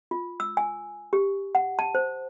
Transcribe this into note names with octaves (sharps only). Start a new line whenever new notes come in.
F4
E6
G#5
G4
F#5
A5
C5